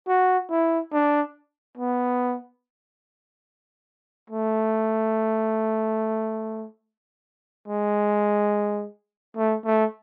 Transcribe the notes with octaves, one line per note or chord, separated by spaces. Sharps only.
F#4
E4
D4
B3
A3
G#3
A3
A3